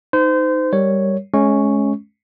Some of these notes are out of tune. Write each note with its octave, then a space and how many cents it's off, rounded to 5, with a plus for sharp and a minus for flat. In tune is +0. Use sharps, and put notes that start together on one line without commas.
D#4 +0 C5 -30
G3 +0 A#4 +0 C#5 +0
G#3 +30 C#4 +0 C#6 +0